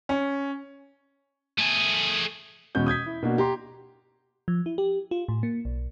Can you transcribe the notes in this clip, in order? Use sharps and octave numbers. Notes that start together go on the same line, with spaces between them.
C#4
A3 G#4
E2 B2 G#3 C#4 F#4 G6
D#6 G6 G#6 B6
E4
B2 A#3 D4 F#4
G4 A#5 C6
F3
E4
G4
F4
A2
A#3
B1